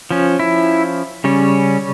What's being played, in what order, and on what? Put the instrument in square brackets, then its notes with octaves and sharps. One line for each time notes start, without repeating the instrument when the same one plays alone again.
[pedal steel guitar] F3 C#4
E4
C#3 G3 C#4